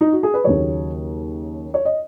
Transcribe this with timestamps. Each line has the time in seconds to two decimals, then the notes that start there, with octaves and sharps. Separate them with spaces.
0.01 D#4
0.12 F#4
0.23 G#4
0.34 B4
0.44 D#2 C#3 F#3 C#5
1.74 C#5
1.85 D#5